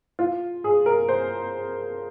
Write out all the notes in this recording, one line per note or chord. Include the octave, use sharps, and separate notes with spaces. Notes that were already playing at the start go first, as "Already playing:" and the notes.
F4
G#4
A#4
C5